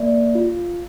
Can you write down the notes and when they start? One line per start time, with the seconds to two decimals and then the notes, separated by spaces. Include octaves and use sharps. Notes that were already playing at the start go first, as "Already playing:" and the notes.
Already playing: A#3 D5
0.35 F4